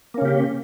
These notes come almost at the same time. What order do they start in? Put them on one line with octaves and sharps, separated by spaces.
A#3 C#4 C#3 G4